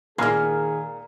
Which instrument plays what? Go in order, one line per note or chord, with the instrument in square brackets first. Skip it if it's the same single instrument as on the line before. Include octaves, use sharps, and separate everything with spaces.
[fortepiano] A#2 F6 [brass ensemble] D#3 G#4 [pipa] G#3 A#3 [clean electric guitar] A#4